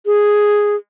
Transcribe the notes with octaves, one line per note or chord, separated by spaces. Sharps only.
G#4